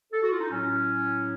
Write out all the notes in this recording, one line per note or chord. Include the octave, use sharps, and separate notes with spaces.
A4
F#4
F4
D#4
A2 F#3 C#4